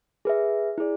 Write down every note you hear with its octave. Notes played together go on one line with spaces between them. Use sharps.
G#4 B4 E5
E4 G#4 D5